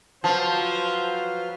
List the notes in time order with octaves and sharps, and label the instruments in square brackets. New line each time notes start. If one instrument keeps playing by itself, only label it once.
[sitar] F3 [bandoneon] F#3 B4 F6 [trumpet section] C5 [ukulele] A5